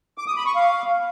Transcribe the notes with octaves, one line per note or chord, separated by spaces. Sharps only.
D6
D#6
B5
C#6
F5